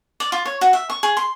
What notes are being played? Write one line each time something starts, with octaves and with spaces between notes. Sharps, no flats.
D5
F4
C#5
F#4
E5
C#6
G#4
C6